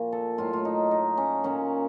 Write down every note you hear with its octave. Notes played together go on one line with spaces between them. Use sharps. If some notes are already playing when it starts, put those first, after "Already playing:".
Already playing: A#2 F3 F#4
A4
A2 F#3 F4
F4
D#4
D#4
C#4
A#2 F#3 C#4